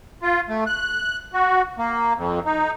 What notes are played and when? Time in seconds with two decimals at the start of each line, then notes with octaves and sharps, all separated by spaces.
0.22 F4
0.49 A3
0.67 F#6
1.34 F#4
1.78 A#3
2.17 F2
2.46 D#4